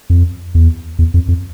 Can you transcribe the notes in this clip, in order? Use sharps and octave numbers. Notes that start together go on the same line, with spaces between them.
F2
E2
E2
F2
F2